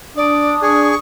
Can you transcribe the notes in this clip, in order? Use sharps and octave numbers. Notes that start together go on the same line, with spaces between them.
D4 D5 D#6
G#4 C#6